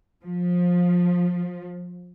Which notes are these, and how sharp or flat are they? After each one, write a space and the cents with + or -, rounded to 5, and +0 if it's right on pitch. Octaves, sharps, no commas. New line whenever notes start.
F3 +20